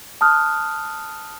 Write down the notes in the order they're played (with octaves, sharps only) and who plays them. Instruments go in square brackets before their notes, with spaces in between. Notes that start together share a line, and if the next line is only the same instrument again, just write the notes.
[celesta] A5 D#6 F6 F#6